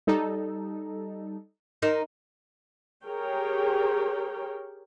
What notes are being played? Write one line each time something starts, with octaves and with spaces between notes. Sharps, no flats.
G3 D#4 A4
D#4 A#4 C5
G4 G#4 A#4 C#5 G5